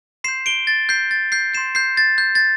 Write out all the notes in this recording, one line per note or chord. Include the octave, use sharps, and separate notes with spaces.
C6 G6 C7 E7
D7 G7
A6
G6 C7
A6
G6 C7
C6 G6 C7 E7
G6 C7
A6
G6
A6